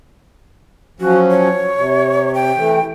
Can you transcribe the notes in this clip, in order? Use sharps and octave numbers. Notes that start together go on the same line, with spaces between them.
F3 F#3 C#4 F#4
C#5
C3
G5
E3 A3